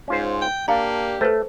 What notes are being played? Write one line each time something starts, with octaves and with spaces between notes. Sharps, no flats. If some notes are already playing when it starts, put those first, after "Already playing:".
G#2 C#4 F4 C5
G5
A#3 D4 G4 F5 A#5
A3 A4 B4 C5